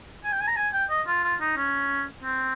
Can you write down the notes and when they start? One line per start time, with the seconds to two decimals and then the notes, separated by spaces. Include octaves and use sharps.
0.24 G#5
0.32 G5
0.40 G#5
0.48 A#5
0.56 G#5
0.73 G5
0.90 D#5
1.07 F4
1.23 F4
1.41 D#4
1.57 C#4
2.23 C4